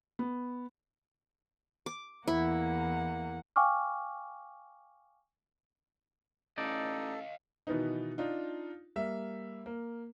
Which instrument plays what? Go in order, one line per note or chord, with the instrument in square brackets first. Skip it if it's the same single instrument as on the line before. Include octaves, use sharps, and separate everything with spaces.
[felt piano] B3
[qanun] D6
[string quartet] E2 A#3 F#5 [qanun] E4
[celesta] F5 G5 G#5 C#6 D6 F6
[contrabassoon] A1 [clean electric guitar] D#4 D5 [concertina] A4 [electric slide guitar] D#5 F5 G#5
[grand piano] B2 D#3 E3 B3 D#4
D4 D#4 F4
G3 A#3 E5
A#3